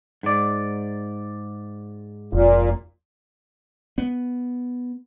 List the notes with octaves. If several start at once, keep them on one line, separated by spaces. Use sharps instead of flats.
G#2 D5
F1 A#2
B3